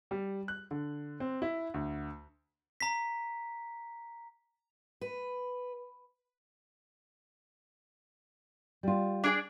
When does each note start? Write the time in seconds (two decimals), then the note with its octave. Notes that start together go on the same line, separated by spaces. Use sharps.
0.11 G3
0.48 F#6
0.71 D3
1.20 C4
1.42 E4
1.74 D2
2.81 A#5 B6
5.01 B4
8.83 G3 F4
9.24 D4 G#4 D5